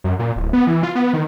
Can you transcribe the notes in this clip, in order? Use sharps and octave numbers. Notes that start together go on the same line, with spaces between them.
F#2
A#2
D1
B3
E3
F4
B3
D#3